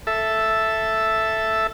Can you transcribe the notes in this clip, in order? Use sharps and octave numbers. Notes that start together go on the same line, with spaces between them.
A4 E5